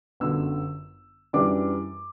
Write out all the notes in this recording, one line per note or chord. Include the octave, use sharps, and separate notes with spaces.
G1 F#2 D3 E6
F#2 E3 G3 D4 D6